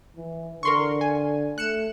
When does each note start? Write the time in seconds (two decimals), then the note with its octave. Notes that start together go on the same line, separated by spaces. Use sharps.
0.17 E3
0.63 D3 A#4 C6 C#6
1.01 G#5
1.58 A3 F#6 C#7 E7